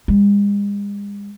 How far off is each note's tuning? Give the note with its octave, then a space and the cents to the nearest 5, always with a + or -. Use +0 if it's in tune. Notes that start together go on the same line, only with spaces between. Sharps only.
G#3 -45